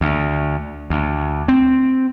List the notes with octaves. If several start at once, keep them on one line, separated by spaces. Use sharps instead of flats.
D2
D2
C4